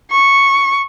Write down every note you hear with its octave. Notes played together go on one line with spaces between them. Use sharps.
C#6